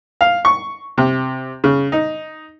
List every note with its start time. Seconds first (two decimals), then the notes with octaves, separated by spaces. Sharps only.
0.21 F5
0.45 C#6
0.98 C3
1.64 C#3
1.92 D#4